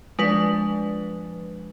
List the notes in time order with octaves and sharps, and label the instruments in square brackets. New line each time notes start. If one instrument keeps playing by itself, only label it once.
[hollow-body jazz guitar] F3 D4 [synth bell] G#3 B4